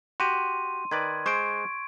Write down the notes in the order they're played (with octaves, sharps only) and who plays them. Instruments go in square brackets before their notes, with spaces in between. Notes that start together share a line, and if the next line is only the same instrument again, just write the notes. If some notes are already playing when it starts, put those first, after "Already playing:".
[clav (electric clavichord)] F#4 G4 [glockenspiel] C6 D#7
[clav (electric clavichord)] D#3 B4 D5 [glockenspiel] G#6
[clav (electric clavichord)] G#3 C5 [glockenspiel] C#6 D7